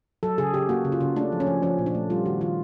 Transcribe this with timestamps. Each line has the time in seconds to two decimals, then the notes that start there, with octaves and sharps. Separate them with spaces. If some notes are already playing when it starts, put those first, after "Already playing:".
0.23 F#3 A4
0.38 C#3 G#4
0.54 C#3 G4
0.69 A#3 F#4
0.85 C#3
0.92 F4
1.01 C#3
1.16 A3 D4
1.32 F3
1.40 C#4
1.47 F3
1.63 F3 C#4
1.79 A#2
1.86 D4
1.95 A3
2.10 G3 F4
2.26 D#3 F#4
2.41 D#3 F4